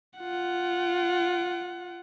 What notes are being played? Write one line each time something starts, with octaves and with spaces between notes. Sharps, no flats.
F4 F#5